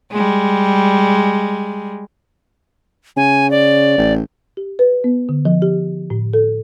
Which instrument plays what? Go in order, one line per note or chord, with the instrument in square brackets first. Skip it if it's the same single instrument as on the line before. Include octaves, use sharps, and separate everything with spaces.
[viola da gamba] G3 G#3
[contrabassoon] C#3 [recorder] G#5
[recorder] D5
[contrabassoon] A1
[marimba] G4
B4
B3
D3
F3
G4
A2
A4